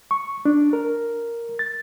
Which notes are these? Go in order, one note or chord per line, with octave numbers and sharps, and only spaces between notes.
C#6
D4
A#4
A6